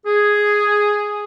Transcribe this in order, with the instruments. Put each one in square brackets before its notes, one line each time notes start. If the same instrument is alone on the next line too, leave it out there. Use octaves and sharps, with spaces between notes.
[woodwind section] G#4